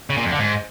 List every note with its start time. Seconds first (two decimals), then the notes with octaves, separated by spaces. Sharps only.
0.10 C#3
0.17 A#2
0.24 F2
0.32 D3
0.39 G#2